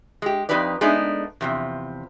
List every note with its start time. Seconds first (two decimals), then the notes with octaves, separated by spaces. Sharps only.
0.22 G#3 G4
0.49 F2 G#2 D#4 G4 B4 D5
0.81 G#3 A3 B3 D4 D#4
1.41 E2 C3 F3